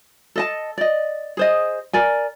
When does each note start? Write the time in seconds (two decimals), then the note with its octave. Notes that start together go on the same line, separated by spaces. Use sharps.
0.36 A4 D#5 A5
0.78 D5 D#5
1.37 G#4 C5 D#5
1.93 A#4 D5 G#5